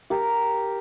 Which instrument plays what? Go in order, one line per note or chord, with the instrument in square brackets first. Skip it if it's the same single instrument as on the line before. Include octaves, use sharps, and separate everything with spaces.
[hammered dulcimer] G4 A#4